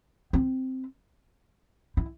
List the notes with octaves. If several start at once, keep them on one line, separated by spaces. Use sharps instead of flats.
C4
E4